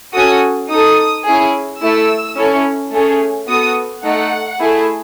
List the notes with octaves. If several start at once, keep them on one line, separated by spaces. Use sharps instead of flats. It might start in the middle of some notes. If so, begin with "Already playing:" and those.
C#4 F#4 A4 D#6
D#4 A4 D#6
C#4 E4 G#4
A3 E4 A4 E6
C#4 E4 A4
A3 C#4 G#4
B3 F#4 A4 D#6
A3 D#4 A4 F#5
A3 E4 G#4